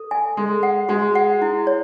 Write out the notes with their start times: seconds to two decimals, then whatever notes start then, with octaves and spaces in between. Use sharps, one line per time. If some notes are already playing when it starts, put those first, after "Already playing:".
Already playing: A4
0.11 G#5
0.37 G#3 A4
0.63 F#5
0.89 G#3 F#4
1.15 F#5
1.42 E4
1.67 C#5